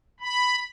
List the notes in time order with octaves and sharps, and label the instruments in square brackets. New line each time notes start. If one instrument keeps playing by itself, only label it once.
[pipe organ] B5